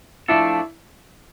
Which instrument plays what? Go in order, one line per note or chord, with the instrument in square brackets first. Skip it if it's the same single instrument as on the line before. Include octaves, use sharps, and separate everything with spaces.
[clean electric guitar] F3 A3 D4 A4 [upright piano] E4